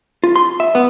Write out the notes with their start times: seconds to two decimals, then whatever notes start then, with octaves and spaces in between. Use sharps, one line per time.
0.24 F4
0.36 C6
0.60 E5
0.75 B3